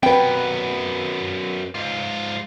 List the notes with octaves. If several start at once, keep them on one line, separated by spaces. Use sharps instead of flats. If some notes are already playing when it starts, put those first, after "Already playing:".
F#2 B3 C4 B4 G5
G#2 F4